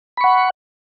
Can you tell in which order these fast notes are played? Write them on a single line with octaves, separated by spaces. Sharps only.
B5 C#6 F#5